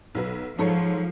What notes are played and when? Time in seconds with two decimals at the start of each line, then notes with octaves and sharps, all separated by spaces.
0.15 B1 F#3 B4
0.58 G#2 F3 A4 C#5